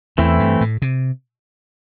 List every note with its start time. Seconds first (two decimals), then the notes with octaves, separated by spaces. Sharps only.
0.18 E2 E3 A3 C4 E4
0.39 G2
0.61 A2
0.82 C3